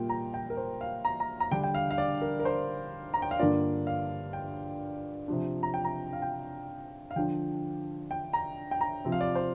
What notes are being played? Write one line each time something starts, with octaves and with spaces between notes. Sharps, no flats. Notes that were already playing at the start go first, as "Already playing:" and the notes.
Already playing: A#2 G3 A#3 F4 G5
A#5
G5
A#4
C5
F5
A#5
A#5
A#5
D3 G3 D4 G5
G5
F5
F5
D5
A#4
A#4
C5
A#5
G5
F5
G2 D3 A#3 D4 F4 D5
F5
G5
C3 F3 D4
A#5
G5
A#5
F5
G5
F5
D3 F3 D4 G5
G5
A#5
G5
A#5
C3 F3 C4
F5
D5
C5